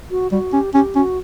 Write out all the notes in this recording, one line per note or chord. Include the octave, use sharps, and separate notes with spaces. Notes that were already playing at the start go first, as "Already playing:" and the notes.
F#4
G3 F#4
C#4 G4
C#4 G4
C#4 F#4